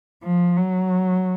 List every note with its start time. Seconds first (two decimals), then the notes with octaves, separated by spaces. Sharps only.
0.23 F3
0.56 F#3